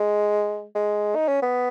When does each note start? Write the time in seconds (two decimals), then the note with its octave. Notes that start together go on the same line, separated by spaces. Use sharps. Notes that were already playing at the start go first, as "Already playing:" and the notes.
Already playing: G#3
0.75 G#3
1.15 D#4
1.28 C#4
1.42 B3